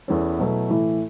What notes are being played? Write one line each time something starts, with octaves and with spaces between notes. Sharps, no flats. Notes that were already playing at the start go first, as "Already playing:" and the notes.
E2 E3 C#4 A4
B2 F#3 A3 E4 B4
A2 E3 A3 E4